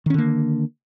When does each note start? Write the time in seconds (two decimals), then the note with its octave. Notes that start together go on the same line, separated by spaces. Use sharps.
0.06 D#3
0.10 C#4
0.14 D3
0.18 A#3